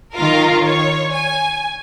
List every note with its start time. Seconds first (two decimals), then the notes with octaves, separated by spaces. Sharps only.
0.14 D#3 F4 A#4
0.63 C#5
1.13 G#5